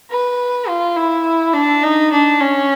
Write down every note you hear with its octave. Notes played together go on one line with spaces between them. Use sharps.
B4
F4
E4
D4
D#4
D4
C#4